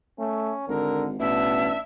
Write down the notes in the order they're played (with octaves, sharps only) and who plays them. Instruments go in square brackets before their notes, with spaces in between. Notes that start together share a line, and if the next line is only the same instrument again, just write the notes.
[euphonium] A3 [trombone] C#4
[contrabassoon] G#1 [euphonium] D3 [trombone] A#4
[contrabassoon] A1 [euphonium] B2 [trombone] D4 [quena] E5